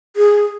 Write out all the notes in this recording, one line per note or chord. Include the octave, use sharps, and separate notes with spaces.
G#4